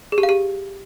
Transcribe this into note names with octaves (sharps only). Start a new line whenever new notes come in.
G#4
G4
F5
G4